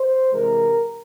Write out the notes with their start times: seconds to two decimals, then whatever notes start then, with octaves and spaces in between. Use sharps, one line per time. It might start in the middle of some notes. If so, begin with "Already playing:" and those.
Already playing: C5
0.33 C3 E3 G#3 A#4